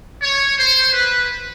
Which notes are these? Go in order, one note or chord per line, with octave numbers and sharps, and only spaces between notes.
C#5
C5
B4